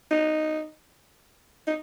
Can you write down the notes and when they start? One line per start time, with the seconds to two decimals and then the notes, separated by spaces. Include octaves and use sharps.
0.11 D#4
1.68 D#4